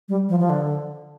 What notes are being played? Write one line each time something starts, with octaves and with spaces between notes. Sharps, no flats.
G3
F3
F3
D3